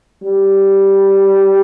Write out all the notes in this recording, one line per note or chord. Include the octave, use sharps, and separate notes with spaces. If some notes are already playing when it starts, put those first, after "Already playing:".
G3